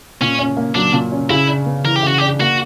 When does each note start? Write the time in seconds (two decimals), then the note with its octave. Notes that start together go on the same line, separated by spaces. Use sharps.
0.21 A#2 C#4
0.39 C#4
0.57 A#3
0.75 F#3 D4
0.93 A#2
1.12 C#4
1.30 C#3 E4
1.48 D4
1.66 B3
1.85 E3 A#4
1.96 G4
2.03 C#3 F#4
2.18 G4
2.21 D4
2.40 A#3 F#4